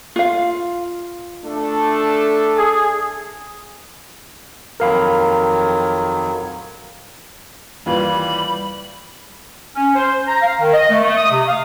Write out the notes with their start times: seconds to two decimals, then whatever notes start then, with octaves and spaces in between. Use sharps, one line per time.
0.16 F4 F5
1.44 A3 D4 A4
2.56 G#4
4.80 F2 D#3 F#3 A#4 F5 B5
7.86 D#2 E3 G3 F4 B5
9.76 C#4
9.96 C5
10.27 A#5
10.42 F5
10.61 D#3
10.73 D#5
10.90 A3
11.03 A3
11.17 D#6
11.31 C3
11.48 F5